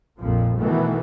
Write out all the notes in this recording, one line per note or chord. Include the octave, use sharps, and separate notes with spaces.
A#1 F2 A#2 F3
B2 D#3 E3 A3 B3